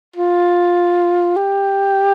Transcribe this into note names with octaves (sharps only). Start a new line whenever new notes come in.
F4
G4